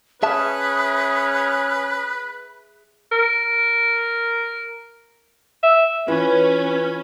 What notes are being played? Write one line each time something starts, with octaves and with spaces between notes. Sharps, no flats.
C#4 G#4 B4 E5 A5 D#6
A#4
E5
E3 C#4 E4 F4 B4